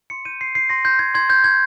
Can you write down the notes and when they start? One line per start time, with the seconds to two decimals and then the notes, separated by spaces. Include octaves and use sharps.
0.10 C6 C#7
0.25 G6 D#7
0.41 C6 C7
0.55 G6 C7
0.69 C6 A#6
0.84 C6 G6
0.99 G6 G#6
1.14 C6 G#6
1.30 G6
1.44 C6 G#6